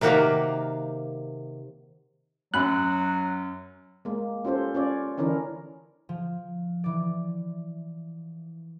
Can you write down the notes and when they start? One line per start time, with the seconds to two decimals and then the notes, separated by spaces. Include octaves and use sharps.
0.01 C3 D#3 A#3 F#4 G4 F5
2.54 F#2 F#3 B5 F#6
4.05 G#3 A#3
4.45 C#4 F4 G4 A4 C5
4.75 C#4 F4 C#5 D5
5.18 D3 E3 C#4 D4 E4 A#4
6.09 F3
6.84 E3 D5